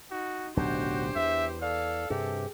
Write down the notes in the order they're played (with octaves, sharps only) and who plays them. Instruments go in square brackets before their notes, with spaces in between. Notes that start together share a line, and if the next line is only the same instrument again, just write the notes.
[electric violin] D#4 [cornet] F#4
[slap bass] D1 B1 [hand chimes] D4 G6 [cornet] F#4 [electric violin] G4 C5
[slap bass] E2 [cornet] E5
[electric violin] A4 [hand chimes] D5 [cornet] F5
[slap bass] G2 C3 [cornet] G4 [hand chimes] G#4